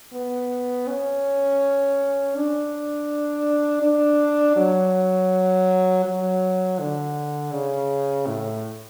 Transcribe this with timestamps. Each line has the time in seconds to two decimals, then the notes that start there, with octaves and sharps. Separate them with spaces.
0.13 B3
0.88 C#4
2.36 D4
3.83 D4
4.57 F#3
6.05 F#3
6.79 D3
7.52 C#3
8.27 A2